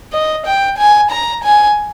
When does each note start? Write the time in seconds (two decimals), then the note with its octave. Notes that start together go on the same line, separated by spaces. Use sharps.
0.13 D#5
0.46 G5
0.78 G#5
1.11 A#5
1.44 G#5